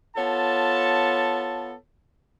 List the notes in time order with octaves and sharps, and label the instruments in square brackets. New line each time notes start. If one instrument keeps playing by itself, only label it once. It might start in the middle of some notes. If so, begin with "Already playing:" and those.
[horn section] B3 F4 A4 C#5 A5